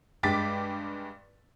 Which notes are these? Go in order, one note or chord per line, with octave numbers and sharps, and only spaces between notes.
G2 G#3 G5 D6 A6 B6